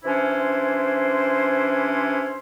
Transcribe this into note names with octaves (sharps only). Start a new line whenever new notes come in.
C3 E3 C#4 D4 E4 C5